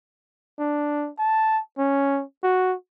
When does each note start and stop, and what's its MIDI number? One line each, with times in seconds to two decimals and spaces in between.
0.59 1.10 62
1.19 1.60 81
1.78 2.23 61
2.43 2.75 66